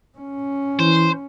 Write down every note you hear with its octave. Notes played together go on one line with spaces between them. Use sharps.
C#4
E3 C5